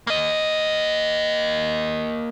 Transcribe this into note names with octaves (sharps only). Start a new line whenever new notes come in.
A#3 D#5